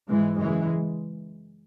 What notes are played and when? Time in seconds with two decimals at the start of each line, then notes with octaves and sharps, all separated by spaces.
0.08 G#2 E3 G#3
0.36 F#2 C#3 E3 G#3